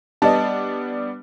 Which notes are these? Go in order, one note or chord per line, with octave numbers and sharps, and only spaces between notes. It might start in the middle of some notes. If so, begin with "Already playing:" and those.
G3 B3 D4 D#5 A5